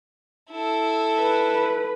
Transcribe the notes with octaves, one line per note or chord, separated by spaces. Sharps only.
E4 A4
B4